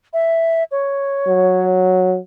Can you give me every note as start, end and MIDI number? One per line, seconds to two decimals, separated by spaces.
0.13 0.64 76
0.71 1.65 73
1.27 2.17 54